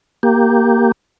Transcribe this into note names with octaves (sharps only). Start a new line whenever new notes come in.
A#3 G4